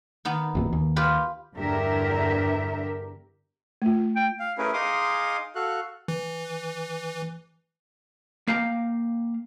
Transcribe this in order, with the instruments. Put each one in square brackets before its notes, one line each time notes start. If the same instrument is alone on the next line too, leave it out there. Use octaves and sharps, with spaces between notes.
[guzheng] D#3 B3
[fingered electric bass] G#1 E2 A#2
D#2
[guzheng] F4 G4 B4
[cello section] E2 G2 D3 G4 A#4 E5
[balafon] A3 F4
[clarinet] G5
[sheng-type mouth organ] F5
A3 C#4 E4 G#4 A#4 B4
D#4 G#4 F5 C6 D6 D#6
F#4 A4 F5 F#6
[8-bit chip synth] E3
[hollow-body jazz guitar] A#3 F5 G5 A#5